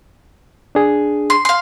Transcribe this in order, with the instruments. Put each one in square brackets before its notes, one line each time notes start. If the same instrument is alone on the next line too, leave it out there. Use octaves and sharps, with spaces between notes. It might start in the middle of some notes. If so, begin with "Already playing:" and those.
[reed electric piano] D4 G#4
[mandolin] C6
F5 C6